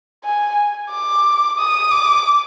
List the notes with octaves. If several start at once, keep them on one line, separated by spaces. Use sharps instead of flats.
G#5
D6
D#6
D6